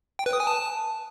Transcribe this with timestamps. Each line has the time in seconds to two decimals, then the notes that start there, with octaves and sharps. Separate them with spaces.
0.19 G5
0.26 B4
0.33 D#6
0.40 G#5
0.47 A5